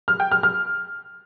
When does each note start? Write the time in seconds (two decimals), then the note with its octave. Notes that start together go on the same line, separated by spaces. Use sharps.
0.08 F6
0.20 G5
0.32 F6
0.43 F6